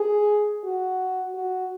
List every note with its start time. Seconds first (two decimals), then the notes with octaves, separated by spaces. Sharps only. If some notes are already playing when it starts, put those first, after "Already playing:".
Already playing: G#4
0.64 F#4
1.34 F#4